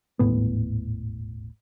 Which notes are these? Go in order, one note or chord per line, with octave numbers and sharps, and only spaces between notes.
D#1 G#1 A2 B3